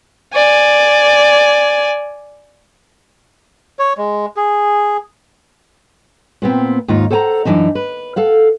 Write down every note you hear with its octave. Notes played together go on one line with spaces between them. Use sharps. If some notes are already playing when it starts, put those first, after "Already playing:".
D5 G#5
C#5
G#3
G#4
A#2 B3 C4
D#2 G#2 D#4 F4
A4 C5 F#5 G#5 A#5
F#2 D#3 E3 D4 D#4
B4
A4 F5 F#5